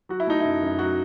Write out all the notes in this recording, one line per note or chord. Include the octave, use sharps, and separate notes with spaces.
F#3 F#4
E4
A3 D#4
F#2 E4
F#2
F#3 F#4